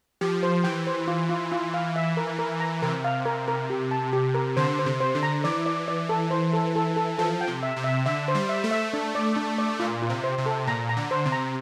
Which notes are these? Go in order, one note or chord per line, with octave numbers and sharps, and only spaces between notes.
F3 G4
C5
E3 G5
C5
F4
F4
F4
F5
E5
A#4
A#4
A#5
C3 A#4
F5
A#4
A#4
G4
A5
G4
A#4
D3 C5
C5
C3
C5
D3
A#5
E3 D5
D5
D5
A4
C5
A4
A4
A4
F3 A4
G5
C3
E5
C3
E5
D3 E5
C5
G3
E5
A3
E5
D4
D5
D4
D5
A#2 F4
F4
C3
C5
C3
A4
A#2 A#5
A#5
D3
C5
C3
A#5